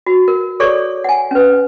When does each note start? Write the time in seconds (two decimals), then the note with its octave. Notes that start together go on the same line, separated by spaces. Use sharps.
0.06 F#4
0.28 A#4
0.60 G#4 A4 C#5 D5 C#6
1.04 F#5 G#5
1.31 C#4 B4